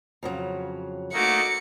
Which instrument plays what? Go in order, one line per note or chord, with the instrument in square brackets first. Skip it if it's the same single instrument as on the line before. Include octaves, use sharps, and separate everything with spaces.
[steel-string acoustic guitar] F2 C#3 F#3
[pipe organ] A3 A#3 D#4 [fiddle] F#4 D6 [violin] C#7